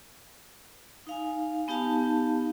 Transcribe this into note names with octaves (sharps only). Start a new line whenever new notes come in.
D#4 F5 G#5
B3 D#4 G4 F5 A5